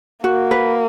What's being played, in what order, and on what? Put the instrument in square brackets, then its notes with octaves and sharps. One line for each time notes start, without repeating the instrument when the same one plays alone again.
[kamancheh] A#3 [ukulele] F#4
[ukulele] B4